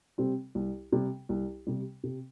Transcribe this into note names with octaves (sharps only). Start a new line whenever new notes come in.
C3 G3 C4
C2
C3 G3
C2
C3 G3
C3